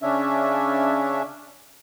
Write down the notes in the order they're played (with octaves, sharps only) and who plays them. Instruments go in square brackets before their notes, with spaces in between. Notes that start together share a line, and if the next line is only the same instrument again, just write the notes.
[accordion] C#3 C#4 D4 E5